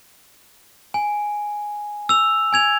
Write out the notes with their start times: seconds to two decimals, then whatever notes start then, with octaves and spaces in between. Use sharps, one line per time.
0.94 G#5
2.09 E6 F7
2.53 G#5 G#6 F7